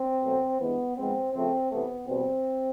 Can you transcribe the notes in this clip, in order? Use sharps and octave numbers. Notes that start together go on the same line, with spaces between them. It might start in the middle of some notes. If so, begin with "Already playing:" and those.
Already playing: C4
B2 F#3 A3
G2 E3 G#3 B3
G#2 F3 G#3 B3 C4
C#3 F3 A3 C4
C3 E3 A3 B3
E2 B2 G3 C4